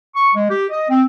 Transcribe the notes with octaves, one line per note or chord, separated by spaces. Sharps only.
C#6
G#3
G4
D#5
C4